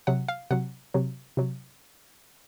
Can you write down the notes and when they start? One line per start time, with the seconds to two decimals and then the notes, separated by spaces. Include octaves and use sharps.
0.07 C3 F#3 F#5
0.28 F5
0.51 C3 F#3 F#5
0.94 C3 F#3
1.37 C3 F#3